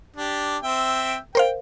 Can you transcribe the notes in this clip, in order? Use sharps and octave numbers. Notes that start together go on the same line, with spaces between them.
D4 G4
C4 E5 G5
A#4 C5 F5 G5